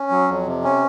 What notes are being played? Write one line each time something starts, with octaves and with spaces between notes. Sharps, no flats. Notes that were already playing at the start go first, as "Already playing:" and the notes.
Already playing: C#4
F#3
F2
C3
C#4